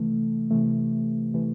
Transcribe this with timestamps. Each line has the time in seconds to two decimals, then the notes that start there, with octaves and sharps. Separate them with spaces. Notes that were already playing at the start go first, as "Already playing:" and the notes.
Already playing: C3 E3 A3
0.51 C3 E3 A3
1.34 C3 E3 A3